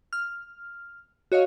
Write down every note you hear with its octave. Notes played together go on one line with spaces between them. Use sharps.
F6
F#4 C#5 D#5 F5